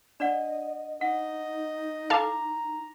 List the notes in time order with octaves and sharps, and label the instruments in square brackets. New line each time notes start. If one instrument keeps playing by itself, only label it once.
[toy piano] D4 D5 F#5 [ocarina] D#5
[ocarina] D#4 [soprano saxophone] D#5 [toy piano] F#5
[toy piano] E4 D6 [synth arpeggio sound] A4 F5 [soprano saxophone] A#5